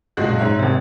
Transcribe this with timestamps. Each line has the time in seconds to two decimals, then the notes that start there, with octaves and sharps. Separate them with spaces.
0.17 F#1 B1 A#2 G#3 F#4 F#6
0.38 G#2 C#5 E5 A#5
0.59 G#1 C3